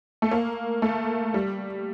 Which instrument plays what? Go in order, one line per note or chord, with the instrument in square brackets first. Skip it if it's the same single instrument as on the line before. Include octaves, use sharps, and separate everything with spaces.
[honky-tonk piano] A3
A#3
A3
G3